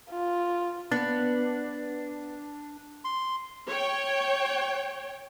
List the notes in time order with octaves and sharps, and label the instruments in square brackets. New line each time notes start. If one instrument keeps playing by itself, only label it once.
[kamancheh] F4
[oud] B3 [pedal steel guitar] D4
[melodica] C6
[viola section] C#5 G5